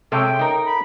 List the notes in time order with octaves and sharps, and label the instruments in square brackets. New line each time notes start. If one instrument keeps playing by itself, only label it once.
[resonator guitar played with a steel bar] C3 G#3 [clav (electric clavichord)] A4 C#5 E5 [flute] G5
[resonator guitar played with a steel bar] D#4 A#4
[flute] B5